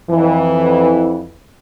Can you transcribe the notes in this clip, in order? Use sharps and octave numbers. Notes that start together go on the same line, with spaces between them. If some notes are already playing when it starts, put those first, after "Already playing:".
F2 E3